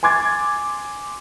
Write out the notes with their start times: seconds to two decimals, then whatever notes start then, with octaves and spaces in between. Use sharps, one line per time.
0.03 G#5 C6 D6 G#6 A6